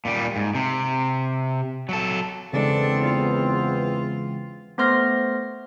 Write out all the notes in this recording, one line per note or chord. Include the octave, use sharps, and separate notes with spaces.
A#2 G3
G#2
C3
F#3 A4
E2 C#3 E3 G#3 B3 C4 D4 A4
F4
A3 B3 C5 C6 F6 A#6